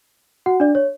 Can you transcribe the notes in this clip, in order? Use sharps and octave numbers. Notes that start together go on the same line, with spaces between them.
F#4 F#5
D4 D5
C#5